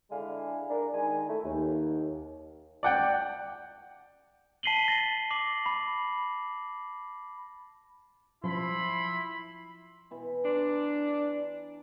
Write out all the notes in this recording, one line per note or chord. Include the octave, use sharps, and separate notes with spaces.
D3 G#3 D4 E4 F5 G#5
D4 A#4
D#3 G#3 G#5
A3 E4
D#2
D5 F#5 G5
A5 B6 C7 D#7 F#7 G7
A6 A#6
D6 C7 F#7
B5
F3 E4 B5 C6
B2 E3 B5
D4 A#5 C6 C#6